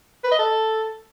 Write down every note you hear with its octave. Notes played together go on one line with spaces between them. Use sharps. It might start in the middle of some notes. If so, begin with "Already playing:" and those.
B4
D#5
A4